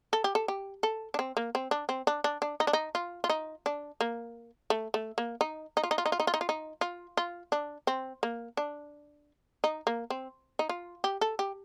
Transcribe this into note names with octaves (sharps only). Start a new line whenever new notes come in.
A4
G4
A4
G4
A4
D4
C4
A#3
C4
D4
C4
D4
D4
D4
D#4
D4
D#4
F4
F4
D#4
D4
A#3
A3
A3
A#3
D#4
D#4
F4
D#4
F4
D#4
F4
D#4
F4
D#4
F4
D#4
F4
F4
D4
C4
A#3
D4
D#4
A#3
C4
D#4
F4
G4
A4
G4